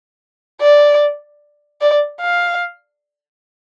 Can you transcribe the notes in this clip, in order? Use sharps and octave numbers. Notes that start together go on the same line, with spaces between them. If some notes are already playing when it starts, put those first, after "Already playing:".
D5
D5
F5